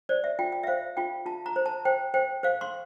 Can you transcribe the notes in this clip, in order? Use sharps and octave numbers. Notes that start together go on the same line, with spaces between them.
C5 D5
E5
F4 G5
G5
E5
C5 F5
F4 G5
F4 A5
A#5
C5
A5
C5 G5
C5 G5
C5 F5
C6